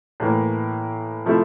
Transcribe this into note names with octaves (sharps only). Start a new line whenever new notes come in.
A2 E3 A#3
C3 F3 A3 E4